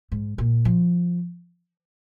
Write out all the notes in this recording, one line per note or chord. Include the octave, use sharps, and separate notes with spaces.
G#2
A#2
F3